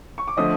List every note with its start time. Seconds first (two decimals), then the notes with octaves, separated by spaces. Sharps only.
0.18 C#6
0.28 D6
0.37 D3 F3 A3 D#5 D#6